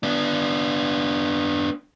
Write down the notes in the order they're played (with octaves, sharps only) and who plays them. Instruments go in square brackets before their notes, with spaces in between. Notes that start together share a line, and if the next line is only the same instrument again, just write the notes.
[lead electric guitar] B3 D4